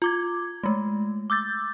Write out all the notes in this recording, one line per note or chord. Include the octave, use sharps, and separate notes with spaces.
F4 D6 G#6
G#3 A3
D6 E6 G6 A6